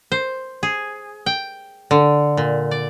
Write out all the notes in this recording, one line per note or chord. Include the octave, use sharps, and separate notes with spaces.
C5
G#4
G5
D3
A#2
D5